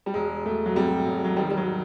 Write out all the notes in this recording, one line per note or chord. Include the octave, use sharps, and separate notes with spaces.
G3
E1 G#3
E1 A3
F#3
C3 G3
E1
F#3
D#3 G3
G3
F#3